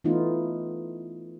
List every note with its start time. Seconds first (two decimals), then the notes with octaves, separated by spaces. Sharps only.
0.04 E3 A3 B3 D#4 F4